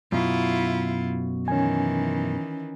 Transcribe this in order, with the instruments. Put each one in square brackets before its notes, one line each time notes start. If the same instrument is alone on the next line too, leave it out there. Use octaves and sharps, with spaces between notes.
[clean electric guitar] F#2 B2 [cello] E4 F4
[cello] D#3 E3 [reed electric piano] C#4 G#5